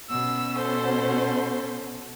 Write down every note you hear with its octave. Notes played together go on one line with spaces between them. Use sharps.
B2 C#4 E6
A4 C5